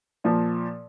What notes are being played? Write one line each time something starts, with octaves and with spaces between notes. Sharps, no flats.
A#2 F3